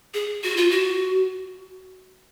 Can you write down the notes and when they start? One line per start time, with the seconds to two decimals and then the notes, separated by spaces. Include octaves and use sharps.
0.14 G#4
0.44 F#4
0.57 F4
0.71 F#4